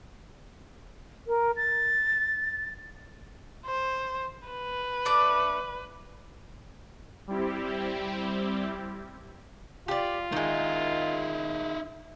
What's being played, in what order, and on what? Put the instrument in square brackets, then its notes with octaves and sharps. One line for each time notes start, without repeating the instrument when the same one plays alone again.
[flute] A#4
A6
[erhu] C5
B4
[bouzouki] A3 D4 D5
[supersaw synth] G3 C4 E4 G4
[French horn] F4 [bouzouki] G4 D5
[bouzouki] D#3 G#3 [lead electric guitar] D#4 E4